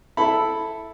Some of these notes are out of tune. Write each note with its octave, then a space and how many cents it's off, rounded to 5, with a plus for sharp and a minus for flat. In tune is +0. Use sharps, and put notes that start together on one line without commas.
E4 +0 A4 +0 B5 +0